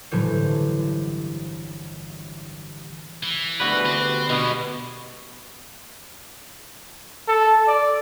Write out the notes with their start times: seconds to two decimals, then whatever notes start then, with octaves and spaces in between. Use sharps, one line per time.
0.11 G1 A2 E3 F#3 C5 C#5
3.23 E3
3.60 D2 G3 B3 F#4 G#4 B4
3.86 C4 G4
4.30 B2 D3 G#3
7.28 A4
7.68 D5